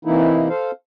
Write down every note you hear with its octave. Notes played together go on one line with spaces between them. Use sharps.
C3 E3 A#3 D#4 E4
A4 C5 F5